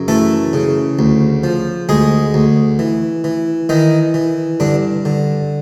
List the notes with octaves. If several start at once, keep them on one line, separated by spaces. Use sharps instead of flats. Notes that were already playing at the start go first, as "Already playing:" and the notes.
Already playing: F#2 C#3
E3 A3 A4
C#3
D2
F3
D2 G#3 G#4
D2
E3
E3
D#3 E3 D#4
E3
G2 D3 D4
D3